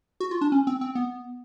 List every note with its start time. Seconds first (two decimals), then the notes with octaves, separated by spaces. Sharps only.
0.20 F#4
0.31 F4
0.41 D4
0.52 C#4
0.67 C4
0.81 C4
0.95 B3